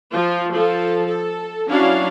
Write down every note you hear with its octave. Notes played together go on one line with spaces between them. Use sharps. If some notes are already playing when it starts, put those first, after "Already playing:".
F3 F4
F3 A4
A4
F#3 C#4 D4 E4 F5